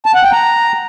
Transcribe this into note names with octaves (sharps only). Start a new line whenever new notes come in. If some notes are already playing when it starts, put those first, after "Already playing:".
A5
F#5
G5
A#5